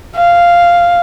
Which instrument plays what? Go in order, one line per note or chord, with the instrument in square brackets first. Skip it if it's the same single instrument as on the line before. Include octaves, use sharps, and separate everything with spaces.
[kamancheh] F5